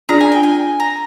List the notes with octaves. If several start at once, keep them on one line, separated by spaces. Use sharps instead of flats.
D4 F4 G#4 D5 A#5
G#5
G5
G#5
A#5